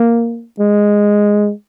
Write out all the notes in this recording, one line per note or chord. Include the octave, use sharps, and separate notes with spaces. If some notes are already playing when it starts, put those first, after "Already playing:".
Already playing: A#3
G#3